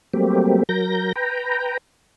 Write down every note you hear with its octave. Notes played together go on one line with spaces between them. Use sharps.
F#3 G3 A3 A#3 C4 G4
F#3 A#4 G6 A#6
B4 G5 A#5